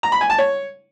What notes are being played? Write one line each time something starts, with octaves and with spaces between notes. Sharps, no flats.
A#5
B5
G#5
A5
C#5